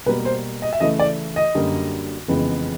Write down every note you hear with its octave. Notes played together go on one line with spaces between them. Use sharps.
B2 G3 A#3 B4
C5
D#5
E5
C#3 E3 A3 D#5
D5
D#5
F#2 D3 G3 A#3
F2 C#3 E3 G#3 B3